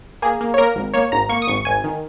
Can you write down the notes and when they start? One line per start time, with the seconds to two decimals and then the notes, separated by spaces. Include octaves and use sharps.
0.22 A#3 G#4
0.41 A#3
0.54 C#5
0.58 A#3 A#4
0.76 G#1
0.94 A#3 C#5
1.12 G#1 A#5
1.29 A#3 C#6
1.42 D#6
1.48 G#1 C#6
1.65 G#1 G#5
1.84 D#3